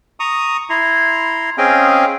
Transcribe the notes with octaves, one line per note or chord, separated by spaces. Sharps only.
A#5 C#6 D#6
E4 A#5 C6
C4 C#4 G#4 D#5 F5 G5